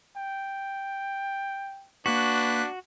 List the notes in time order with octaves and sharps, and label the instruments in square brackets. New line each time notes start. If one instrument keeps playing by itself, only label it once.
[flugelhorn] G5
[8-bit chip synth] A#3 F#6 B6 [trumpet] D4 [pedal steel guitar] F#4 [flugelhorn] B4